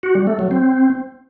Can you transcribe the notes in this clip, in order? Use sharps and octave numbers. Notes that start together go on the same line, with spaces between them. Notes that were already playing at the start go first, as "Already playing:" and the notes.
F#4
G3
A3
F#3
C4